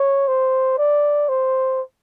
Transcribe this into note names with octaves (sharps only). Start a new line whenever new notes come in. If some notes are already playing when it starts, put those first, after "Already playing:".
Already playing: C#5
C5
D5
C5